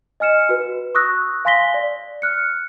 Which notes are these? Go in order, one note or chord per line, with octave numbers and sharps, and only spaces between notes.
D#5 G#5 F6 C#7 E7
F#4 B4
C#6 D#6 E6 F#6 A#6
F5 G#5 C6 A#6 B6 G7
D5
F6 F#6 C#7